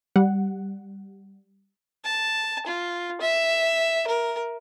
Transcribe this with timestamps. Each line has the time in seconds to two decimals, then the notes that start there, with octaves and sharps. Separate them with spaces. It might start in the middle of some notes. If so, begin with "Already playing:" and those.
0.16 G3 F#5
2.04 A5
2.67 F4
3.21 E5
4.07 A#4